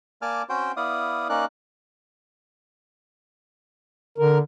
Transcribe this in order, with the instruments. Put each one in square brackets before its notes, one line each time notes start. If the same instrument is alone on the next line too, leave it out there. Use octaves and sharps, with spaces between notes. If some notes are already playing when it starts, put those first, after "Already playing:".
[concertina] A#3 D5 G#5 A5 D6 F6
C4 C#4 F#4 C5 G5
B3 E4 D5 F5 D#6
A#3 C#4 D#4 D5 F#6
[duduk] D3 [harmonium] A#4